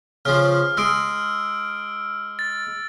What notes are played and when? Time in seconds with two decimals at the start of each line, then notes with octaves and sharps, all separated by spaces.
0.25 C#3 F3 F6
0.77 G#3 E6 F6 D7
2.39 A6